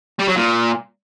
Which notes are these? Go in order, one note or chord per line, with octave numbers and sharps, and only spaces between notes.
G3
F#3
A#2